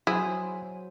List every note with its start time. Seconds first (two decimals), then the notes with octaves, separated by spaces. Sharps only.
0.07 F#3 E4 G#4 C5